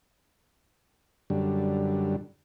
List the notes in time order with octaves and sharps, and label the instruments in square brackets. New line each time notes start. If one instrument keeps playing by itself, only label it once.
[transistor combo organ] F#2 D3 G3